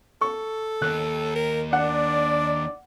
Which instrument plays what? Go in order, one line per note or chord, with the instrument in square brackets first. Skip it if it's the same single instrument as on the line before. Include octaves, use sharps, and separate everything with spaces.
[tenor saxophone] A4 [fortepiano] C#6
[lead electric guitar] D#2 [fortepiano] F#6
[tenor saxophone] A#4
[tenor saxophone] D4 [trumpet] D5 [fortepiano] F#5